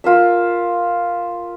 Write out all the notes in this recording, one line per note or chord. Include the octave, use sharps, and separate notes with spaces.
F4 A#4 E5